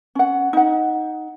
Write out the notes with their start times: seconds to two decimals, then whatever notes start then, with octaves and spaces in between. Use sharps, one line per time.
0.15 C#4 F#5
0.53 D#4 F#5